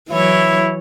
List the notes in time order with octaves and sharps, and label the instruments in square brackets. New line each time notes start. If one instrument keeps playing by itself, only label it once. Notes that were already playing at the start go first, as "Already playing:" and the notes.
[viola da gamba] E3 F#3 C#5 [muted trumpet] E4